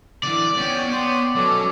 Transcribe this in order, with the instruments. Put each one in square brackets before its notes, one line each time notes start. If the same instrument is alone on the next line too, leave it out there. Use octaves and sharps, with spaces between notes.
[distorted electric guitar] D3 E3 [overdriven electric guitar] D5
[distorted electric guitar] B3 C#4 [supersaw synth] C#5 G5
[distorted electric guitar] B3 [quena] C6
[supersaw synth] B2 C#4 A4 [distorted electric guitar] F#3 [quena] D6